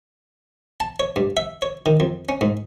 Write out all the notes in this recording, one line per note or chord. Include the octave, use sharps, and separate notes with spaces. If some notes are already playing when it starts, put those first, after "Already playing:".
A5
C#5
G2
E5
C#5
D#3
F2
C#4
G#2